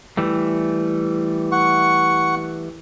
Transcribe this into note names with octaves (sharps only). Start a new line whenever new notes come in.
E3 G3 A3
F#5 C#6